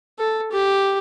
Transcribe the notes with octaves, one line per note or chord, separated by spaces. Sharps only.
A4
G4